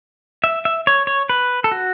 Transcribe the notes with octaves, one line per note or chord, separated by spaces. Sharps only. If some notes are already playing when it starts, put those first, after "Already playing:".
E5
E5
C#5
C#5
B4
A4
F#4